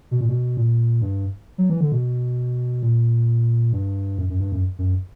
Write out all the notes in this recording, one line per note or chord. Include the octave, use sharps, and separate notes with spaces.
B2
A#2
B2
A#2
G2
F#3
E3
D3
B2
A#2
G2
F#2
F#2
G2
F#2
F#2